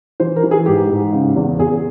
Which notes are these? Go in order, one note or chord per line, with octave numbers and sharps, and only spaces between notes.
E3 C5
A#4
E3
G#4
G#2 G4
G#2
C#3
E2
E2 G#4